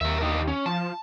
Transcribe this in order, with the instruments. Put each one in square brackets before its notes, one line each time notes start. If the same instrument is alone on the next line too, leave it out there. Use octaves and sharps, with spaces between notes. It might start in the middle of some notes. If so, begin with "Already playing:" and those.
[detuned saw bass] D#2 [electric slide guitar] A#4 E5
[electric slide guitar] D4 D#4 G4
C#4
[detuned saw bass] F3 [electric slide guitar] A5